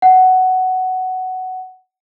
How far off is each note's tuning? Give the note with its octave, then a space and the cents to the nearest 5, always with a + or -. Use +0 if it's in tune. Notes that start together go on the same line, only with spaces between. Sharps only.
F#5 +10